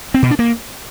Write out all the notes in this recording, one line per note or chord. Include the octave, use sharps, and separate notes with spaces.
C4
B2
D4
A#3